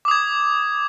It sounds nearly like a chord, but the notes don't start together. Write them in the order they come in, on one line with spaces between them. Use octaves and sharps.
D6 D#6 G#6